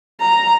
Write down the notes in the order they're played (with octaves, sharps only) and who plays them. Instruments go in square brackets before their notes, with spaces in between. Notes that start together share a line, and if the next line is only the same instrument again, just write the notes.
[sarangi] A#5